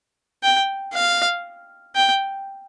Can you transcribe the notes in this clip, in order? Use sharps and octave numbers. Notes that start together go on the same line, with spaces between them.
G5
F5
G5